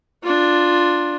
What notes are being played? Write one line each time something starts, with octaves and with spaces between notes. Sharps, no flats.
D4 F4